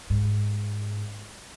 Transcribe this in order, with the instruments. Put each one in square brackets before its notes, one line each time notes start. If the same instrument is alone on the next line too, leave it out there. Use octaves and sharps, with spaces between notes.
[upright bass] G#2